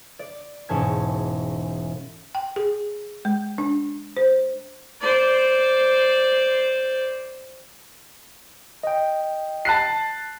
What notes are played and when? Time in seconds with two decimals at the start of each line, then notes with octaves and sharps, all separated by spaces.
0.19 D5
0.69 E1 G#2 C#4 A5 G#6
2.35 G5
2.56 G#4
3.25 G#3
3.58 D4
4.17 C5
5.01 C5 D5
8.83 D#5 G5
9.65 A5 F#6 C7